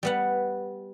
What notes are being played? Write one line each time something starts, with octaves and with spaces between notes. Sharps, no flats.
G3 B3 F#5